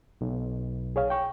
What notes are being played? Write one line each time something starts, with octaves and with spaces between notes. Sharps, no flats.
B1
G#4 C#5 F5
G5 C#6